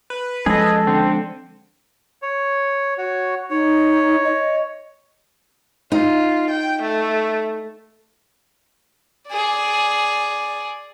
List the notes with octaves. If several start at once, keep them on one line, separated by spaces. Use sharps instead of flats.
B4
F3 G#3 C#4 G#4 A4 D#5
D3 C4
C#5
F#4 C#5
D#4 C#5
D#5
D#4 F4
G5
A3
G#4 D5